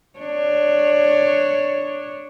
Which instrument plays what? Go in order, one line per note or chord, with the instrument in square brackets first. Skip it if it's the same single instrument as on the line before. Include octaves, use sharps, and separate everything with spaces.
[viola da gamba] D4 C#5